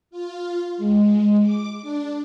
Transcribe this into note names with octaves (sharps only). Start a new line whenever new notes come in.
F4
G#3
D6
D4